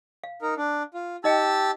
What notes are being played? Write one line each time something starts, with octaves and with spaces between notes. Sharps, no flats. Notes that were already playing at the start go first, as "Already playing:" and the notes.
F5
D#4 A#4
D4
F4
D#4 G4 D#5 G5 A5 E6